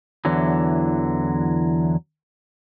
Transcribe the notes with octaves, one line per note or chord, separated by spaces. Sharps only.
E2 D3 E3 F#3